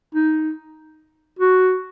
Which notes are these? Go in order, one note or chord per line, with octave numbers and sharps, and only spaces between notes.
D#4
F#4